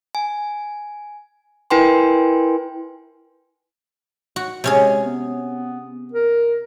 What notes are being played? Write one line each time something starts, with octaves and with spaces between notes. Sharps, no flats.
G#5
E4 A#4 B4 G5 G#5 C6
F#4
C3 G#3 C#4 G#4
B3
A#4